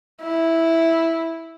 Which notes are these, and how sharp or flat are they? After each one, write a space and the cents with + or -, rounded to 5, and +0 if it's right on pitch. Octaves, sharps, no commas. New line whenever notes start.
E4 -5